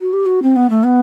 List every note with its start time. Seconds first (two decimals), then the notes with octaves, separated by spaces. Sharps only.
0.01 F#4
0.13 G4
0.26 F#4
0.42 C4
0.56 B3
0.70 A3
0.83 B3